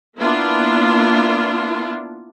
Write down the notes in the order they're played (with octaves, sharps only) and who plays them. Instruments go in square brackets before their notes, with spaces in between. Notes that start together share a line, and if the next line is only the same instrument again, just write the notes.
[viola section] A#3 B3 D4 E4 F4